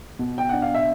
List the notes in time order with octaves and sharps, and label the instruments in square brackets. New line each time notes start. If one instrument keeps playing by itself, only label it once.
[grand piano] B2
G5
D4 F#5
F5
E5